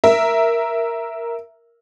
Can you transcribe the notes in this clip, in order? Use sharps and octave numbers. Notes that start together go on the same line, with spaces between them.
A#4 E5